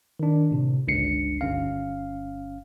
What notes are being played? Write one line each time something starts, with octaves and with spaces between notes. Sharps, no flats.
D#3 D4
A2 C3
G1 C#2 D4 C7 C#7
G1 C#4 F5